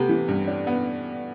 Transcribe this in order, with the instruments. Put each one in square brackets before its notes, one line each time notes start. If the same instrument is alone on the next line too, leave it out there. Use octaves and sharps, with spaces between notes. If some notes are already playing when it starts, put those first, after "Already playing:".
Already playing: [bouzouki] C3 [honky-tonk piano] A3 B3
[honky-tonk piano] E3
G2
D4
B3